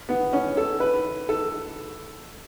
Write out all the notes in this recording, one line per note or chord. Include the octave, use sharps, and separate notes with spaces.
B3
C#4
A4
B4
A4